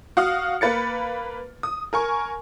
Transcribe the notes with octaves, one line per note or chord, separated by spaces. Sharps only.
F#4 F5 D#6 F6
A#3 B4 A6 C#7
D#6
A#4 G#5 C#6